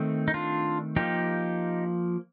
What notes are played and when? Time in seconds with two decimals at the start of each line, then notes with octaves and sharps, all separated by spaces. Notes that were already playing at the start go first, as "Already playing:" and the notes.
Already playing: D#3 A3 C4
0.28 D#4
0.34 D4 F4
0.96 F3 A#3 D#4 G4